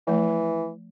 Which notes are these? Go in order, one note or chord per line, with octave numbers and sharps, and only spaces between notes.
E3 F3 A3